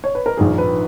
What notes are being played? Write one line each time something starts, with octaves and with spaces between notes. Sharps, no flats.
C#5
B4
A#4
A#1 G#2 D#3 G#4
B4